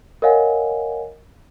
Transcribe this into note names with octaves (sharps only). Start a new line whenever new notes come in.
A#4 C#5 D#5 F5 F#5 G#5